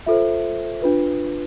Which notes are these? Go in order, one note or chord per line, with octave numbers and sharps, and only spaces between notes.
F4 A4 C5 E5
D4 F4 B4